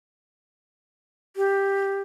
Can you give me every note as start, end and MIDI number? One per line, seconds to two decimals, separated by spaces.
1.36 2.01 67